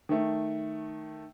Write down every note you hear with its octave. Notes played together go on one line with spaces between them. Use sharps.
D#3 A3